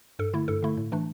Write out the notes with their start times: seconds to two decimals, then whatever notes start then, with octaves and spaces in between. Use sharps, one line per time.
0.19 G2 A4
0.33 D3 A3 E4
0.48 G2 A4
0.62 D3 A3 E4
0.77 A2
0.92 E3 A3 D4